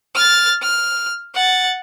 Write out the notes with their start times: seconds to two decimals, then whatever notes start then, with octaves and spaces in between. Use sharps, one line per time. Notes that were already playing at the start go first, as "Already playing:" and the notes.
0.16 F6 A6
0.62 F6
1.35 F#5 A6